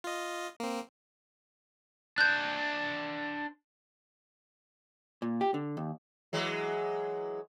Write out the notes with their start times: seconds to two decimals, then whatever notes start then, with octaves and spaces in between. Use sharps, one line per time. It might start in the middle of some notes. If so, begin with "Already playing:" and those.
0.04 F4 D#5
0.60 A#3 C4
2.18 D4 C5 F#6 G6
5.22 A#2
5.41 G4
5.54 D3
5.77 D#2
6.33 E3 F#3 G#3